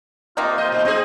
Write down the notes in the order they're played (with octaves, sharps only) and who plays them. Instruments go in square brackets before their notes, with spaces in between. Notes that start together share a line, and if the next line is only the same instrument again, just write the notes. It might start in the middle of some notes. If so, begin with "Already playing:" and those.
[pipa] C3 A#3 D#4 [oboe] F4
[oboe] C5 [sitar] D#5
[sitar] A#2
[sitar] C4 G#4 [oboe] D#5